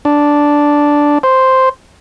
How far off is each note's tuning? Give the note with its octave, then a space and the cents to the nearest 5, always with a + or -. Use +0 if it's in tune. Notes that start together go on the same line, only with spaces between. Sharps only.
D4 -5
C5 +0